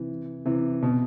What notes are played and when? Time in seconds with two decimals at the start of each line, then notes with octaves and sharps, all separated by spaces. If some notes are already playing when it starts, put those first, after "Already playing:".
Already playing: C3 E3
0.46 C3 E3
0.83 B2